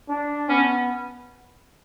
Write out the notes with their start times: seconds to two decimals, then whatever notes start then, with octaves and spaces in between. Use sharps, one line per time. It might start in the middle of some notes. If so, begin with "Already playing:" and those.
0.09 D4
0.49 B3 C#4